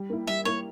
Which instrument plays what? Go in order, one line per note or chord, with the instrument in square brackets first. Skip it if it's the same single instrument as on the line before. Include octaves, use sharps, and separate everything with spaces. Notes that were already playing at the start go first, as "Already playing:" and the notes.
Already playing: [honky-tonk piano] G3
A#3 E4
[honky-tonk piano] G3 [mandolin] E5
[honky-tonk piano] A#3 E4 [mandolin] C#5